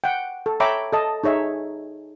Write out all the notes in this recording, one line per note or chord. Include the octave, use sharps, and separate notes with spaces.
F#5 G5
A4
C#5 E5 G5 A#5 B5 D6
A4 D#5 A5
D#4 G#4 C#5 E5